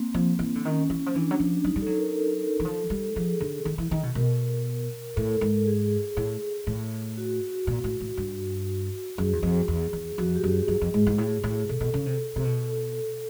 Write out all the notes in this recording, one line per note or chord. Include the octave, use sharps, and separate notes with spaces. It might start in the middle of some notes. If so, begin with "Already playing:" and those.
Already playing: A#3 C4
F3
E3
D3
D#3 C#4
E3
F3
E3 D4
F#3
F3
F#3 D#4
G3
F#3 A4
A#4
A4
E3
F3
G3
F3 G#4
D3
D#3
E3
D#3
B2
B2 A#4
A2 A4
G#2
G#4
A2
A2
F#4
A#2
A2
A2
G2
F#2 G#4
E2
F2
E2
E2
F2 F#4
G4
F#2
G#4
F#2
F2
G#2
G#2
A2
A2
B2 A4
B2
C#3
C3
C3
B2
A4